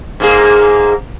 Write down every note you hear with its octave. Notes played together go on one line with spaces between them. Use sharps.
G#2 A#3 G#4